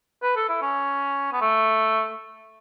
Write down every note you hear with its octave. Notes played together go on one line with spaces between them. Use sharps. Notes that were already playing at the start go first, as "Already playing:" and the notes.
B4
A4
E4
C#4
B3
A3